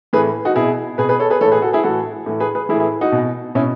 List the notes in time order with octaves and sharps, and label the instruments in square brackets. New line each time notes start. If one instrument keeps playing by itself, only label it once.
[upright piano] A2 E3 G#4 B4
D#4 F#4
B2 E4 G#4
B2 G#4 B4
G#4 B4
A4 C#5
G#4 B4
E3 A4 C#5
A2
G#4 B4
F#4 A4
E4 G#4
A2 E3 F#4 A4
A2 E3
G#4 B4
G#4 B4
E3 E4 G#4
A2
E4 G#4
D#4 F#4
B2
B2 C#4 E4